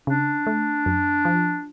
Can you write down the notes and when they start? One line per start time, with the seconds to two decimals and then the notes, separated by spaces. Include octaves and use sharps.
0.07 C#3 D4
0.47 A3
0.86 F#2
1.25 F3